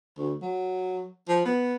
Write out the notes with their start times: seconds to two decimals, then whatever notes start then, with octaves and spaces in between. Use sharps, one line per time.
0.18 D2
0.42 F#3
1.28 F3
1.45 B3